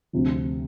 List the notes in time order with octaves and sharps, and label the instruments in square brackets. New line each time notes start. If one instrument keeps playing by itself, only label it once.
[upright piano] D2 C3 F3